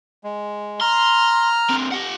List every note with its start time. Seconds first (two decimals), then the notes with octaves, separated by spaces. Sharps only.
0.24 G#3
0.81 A#5 C6 F6
1.70 D3 C4
1.92 G4 F#5